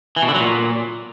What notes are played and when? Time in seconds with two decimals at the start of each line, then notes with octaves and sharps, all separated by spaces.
0.16 E3
0.22 B2
0.28 D3
0.34 F#3
0.40 A#2